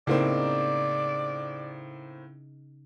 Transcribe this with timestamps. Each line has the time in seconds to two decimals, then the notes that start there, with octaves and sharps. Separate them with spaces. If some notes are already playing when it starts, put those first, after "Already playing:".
0.07 A2 C#3 A#3 C4 D#4 D5